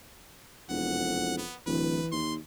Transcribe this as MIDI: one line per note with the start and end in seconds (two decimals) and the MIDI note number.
0.70 1.40 28
0.70 1.47 41
0.70 1.34 78
1.38 1.56 59
1.67 2.00 26
1.67 2.17 52
1.67 2.06 71
2.12 2.37 39
2.12 2.34 84